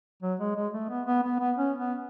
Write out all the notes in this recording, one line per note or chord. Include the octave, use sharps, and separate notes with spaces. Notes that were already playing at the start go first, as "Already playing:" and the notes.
F#3
G#3
G#3
A3
B3
B3
B3
B3
C#4
B3